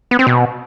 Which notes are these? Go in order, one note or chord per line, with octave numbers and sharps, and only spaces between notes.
B3
C4
B2